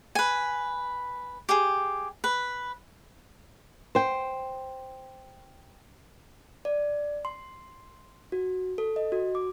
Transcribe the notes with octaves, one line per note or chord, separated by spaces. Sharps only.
B4 G#5
G4 G#4
B4
C5 G5
D5
C6
F#4
A4
D#5
F#4
D6